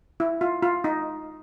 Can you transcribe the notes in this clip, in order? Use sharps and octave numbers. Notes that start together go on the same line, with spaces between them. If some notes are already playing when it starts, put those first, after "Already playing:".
E4
F4
F4
D#4